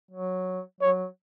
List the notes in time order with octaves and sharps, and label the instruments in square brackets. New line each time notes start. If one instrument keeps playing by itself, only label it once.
[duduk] F#3
[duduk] F#3 [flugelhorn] C#5